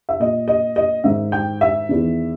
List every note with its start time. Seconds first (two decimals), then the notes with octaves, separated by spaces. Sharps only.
0.09 E5
0.20 A#2 D#5
0.48 D#5
0.76 D#5
1.04 G#2 D#3 E5
1.32 G5
1.61 E5
1.89 E2 D#3